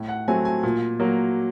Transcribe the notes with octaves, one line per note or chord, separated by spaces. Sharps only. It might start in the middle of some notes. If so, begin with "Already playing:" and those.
Already playing: A2
F#5
F#3 A3 C4 G#5
G#5
A#2
F#3 A#3